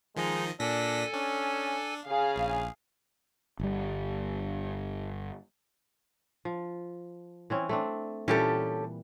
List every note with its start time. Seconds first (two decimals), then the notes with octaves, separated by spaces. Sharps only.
0.16 D#3 F3 G#3 D#4 D#5
0.60 A#2 D4 A4 G#5 A#6 B6
1.14 C#4 D4
2.07 C#3 G#4 F5
2.36 A#1
3.60 G1 G3
6.45 F3
7.50 E3 C4 C#4
7.69 A3 C4 D4
8.28 A#2 E3 G3 C#4 G4 A4